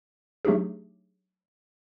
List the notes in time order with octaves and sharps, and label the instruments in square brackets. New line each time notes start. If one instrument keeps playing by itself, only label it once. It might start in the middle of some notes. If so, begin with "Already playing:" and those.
[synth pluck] F#3 A3 D4 D#4 G4 G#4